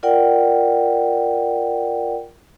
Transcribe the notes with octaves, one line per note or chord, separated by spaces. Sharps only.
F4 A#4 D5 F#5 G5